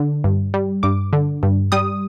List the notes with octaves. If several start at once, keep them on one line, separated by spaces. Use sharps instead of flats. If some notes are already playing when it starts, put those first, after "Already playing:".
Already playing: D3
G2
G3
G2 D6
D3
G2
G3 D#6